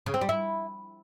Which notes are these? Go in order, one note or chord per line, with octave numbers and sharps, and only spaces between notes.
C#3
C4
G3
E4